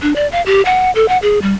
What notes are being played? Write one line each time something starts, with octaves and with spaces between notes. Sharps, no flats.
D4
D5
F5
G4
F#5
A4
F#5
G#4
G3